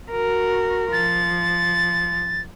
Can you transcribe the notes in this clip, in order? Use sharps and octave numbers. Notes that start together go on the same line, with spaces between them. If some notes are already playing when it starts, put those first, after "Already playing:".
F#4 A#4
F3 A6